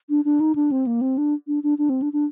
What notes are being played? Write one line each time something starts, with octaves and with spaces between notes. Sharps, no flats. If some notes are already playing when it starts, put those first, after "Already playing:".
D4
D4
D#4
D4
C4
A#3
C4
D4
D4
D4
D4
C4
D4
D4